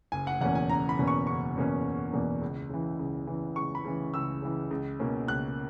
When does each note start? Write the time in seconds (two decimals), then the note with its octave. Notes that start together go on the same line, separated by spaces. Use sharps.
0.12 F#1 G#5
0.27 F#5
0.41 E2 B2 A#3 C#4 F#5
0.55 G#5
0.69 F#1 A#5
0.89 B5
0.99 E2 B2 A#3 C#4
1.07 C#6
1.27 F#1 C#6
1.56 E2 B2 A#3 C#4
1.85 F#1
2.13 E2 B2 A#3 C#4
2.42 C#2
2.70 C#3 E3
2.99 C#2
3.27 C#3 E3
3.56 C#2 C#6
3.75 B5
3.85 C#3 E3
4.14 C#2 E6
4.42 C#3 E3
4.71 C#2
4.99 B2 A#3 C#4
5.28 C#2 F#6